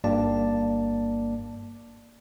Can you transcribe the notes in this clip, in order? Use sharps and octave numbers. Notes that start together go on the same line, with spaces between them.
G1 G2 A#3 D5 A5